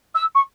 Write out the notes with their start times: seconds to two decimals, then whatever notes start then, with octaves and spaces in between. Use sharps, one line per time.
0.15 E6
0.35 C#6